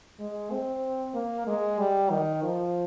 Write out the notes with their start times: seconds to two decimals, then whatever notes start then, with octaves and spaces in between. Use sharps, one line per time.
0.19 G#3
0.51 C4
1.14 A#3
1.47 G#3
1.79 G3
2.11 D#3
2.43 F3